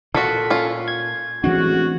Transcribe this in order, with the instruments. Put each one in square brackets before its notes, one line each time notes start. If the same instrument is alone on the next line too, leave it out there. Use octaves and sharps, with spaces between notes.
[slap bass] A#2 [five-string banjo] F4 F#4 [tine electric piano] A4 B6
[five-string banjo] C#4 F4
[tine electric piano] G#6
[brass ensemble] A1 G#3 F#4 [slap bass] E3 C4 D4